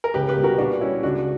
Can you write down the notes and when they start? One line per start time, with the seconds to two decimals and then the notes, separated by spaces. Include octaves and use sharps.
0.04 A#4
0.14 C#2 G4 B4
0.29 G4 B4
0.37 B2 G3
0.43 F#4 A#4
0.58 A#2 D4 F#4
0.81 G3 C#4 E4
1.03 C#2 D4 F#4